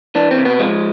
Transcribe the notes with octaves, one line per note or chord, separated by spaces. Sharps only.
E3 D4
C4
C3
B3
F3 G#3